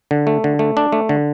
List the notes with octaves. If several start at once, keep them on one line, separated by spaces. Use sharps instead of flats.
D3
A3
D3
A3
D4
A3
D3